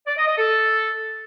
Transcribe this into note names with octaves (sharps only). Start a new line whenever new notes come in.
D5
D#5
D#5
A4